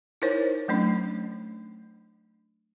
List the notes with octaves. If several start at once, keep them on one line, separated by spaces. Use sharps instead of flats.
D#4 E4 A#4 C5 C#5
F#3 A3 C#4 D4